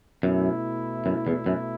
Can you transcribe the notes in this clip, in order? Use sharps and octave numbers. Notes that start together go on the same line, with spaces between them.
F#2 B2 A3 E4
F#2
E2
F#2